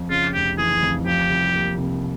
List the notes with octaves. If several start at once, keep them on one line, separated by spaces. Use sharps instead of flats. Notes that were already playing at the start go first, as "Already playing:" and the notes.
Already playing: F2
C#3 F4
F1 G4
E3 G#4
F2
F3 G4
C2
A#3
C3